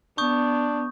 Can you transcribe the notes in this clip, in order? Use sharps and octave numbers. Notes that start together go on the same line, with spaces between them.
B3 D4 C#6 D#6 G6